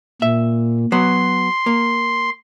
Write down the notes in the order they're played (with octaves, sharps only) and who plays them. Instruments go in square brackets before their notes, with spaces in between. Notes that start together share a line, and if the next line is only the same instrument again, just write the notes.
[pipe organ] A#2 [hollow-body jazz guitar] E5
[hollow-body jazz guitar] F#3 B3 [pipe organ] C6
[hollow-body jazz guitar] A#3